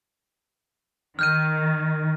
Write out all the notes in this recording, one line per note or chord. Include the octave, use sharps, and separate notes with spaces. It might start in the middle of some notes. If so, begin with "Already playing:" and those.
D#3 F6 G6 D#7